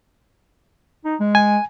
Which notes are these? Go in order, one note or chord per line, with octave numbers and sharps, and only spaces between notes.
D#4
G#3
G#5